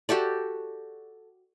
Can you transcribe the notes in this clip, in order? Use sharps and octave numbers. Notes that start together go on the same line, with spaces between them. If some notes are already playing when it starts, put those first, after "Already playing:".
F#4 G4 A4 D5